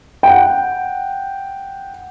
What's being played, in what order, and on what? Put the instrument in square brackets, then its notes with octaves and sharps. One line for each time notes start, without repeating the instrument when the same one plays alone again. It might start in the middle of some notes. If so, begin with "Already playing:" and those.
[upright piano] F#5 G5